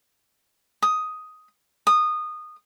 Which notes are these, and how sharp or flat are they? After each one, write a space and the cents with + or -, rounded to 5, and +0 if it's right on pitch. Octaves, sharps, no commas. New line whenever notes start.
D#6 +5
D#6 -20